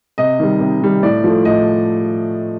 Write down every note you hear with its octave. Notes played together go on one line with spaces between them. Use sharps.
C3 D#5
D#3 G3
C3
D#3 G3
A2 D5
F3 A3
A2 D#5